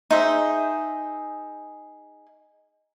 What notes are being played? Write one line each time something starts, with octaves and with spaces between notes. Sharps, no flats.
D#4 G#4 C5 E5